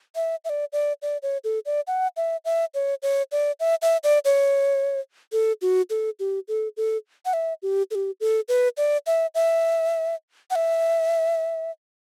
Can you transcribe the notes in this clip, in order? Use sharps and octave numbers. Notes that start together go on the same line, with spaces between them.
E5
E5
D5
D5
D5
C#5
A4
D5
F#5
E5
E5
C#5
C#5
D5
E5
E5
D5
C#5
A4
F#4
A4
G4
A4
A4
F#5
E5
G4
A4
G4
A4
B4
D5
E5
E5
F#5
E5